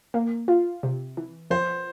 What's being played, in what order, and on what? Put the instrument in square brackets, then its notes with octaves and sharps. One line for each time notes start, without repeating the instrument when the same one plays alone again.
[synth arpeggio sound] A#3
F4
C3
E3
[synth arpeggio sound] F3 [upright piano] C5